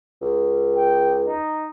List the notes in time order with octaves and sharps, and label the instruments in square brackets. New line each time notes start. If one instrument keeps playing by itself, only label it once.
[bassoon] C#2
[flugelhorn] G5
D#4